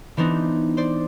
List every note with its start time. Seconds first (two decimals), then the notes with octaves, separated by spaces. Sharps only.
0.17 E3 B3 C4 D4 D#4
0.77 C5 D5